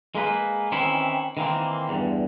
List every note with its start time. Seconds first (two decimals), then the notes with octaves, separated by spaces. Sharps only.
0.15 G#3 A#3 B4
0.72 D#3 E3 C4 C#4 E4
1.37 D#3 E3 A#3 C4
1.89 E2 G2